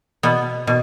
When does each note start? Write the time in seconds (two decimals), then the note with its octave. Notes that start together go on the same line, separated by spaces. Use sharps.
0.23 B2 B3
0.67 B2